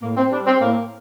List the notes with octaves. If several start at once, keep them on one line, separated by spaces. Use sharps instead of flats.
A2 A#3
C4
G3 D4
C4
A2 A#3